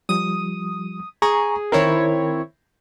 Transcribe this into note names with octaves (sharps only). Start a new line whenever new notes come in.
F3 G3 D#6
G#4 G#5 A#5 C#6
D#3 C4 E4 A#4 C#5